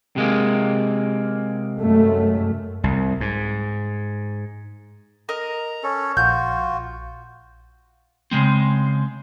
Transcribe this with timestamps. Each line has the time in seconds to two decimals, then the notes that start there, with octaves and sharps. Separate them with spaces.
0.16 C3 G#3 A#3
1.81 F#2 A3
2.84 C2
3.21 G#2
5.29 A#4 D#5 A#5
5.83 C#4 A4
6.17 A#1 F4 F#4 G6
8.31 C#3 G#3 C4